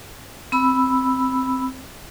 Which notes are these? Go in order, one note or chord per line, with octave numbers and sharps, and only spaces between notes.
C4 B5 E6